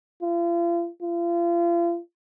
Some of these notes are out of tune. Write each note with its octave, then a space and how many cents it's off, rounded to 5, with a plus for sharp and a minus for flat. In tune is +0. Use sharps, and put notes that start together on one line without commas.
F4 -40
F4 -35